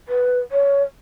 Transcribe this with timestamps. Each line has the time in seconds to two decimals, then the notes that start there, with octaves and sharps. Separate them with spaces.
0.08 B4
0.52 C#5